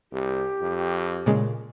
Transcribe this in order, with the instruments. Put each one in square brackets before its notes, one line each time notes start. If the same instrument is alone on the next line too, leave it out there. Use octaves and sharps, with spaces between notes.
[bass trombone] C2 [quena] G4
[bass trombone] F2
[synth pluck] A#2 C#3 G#3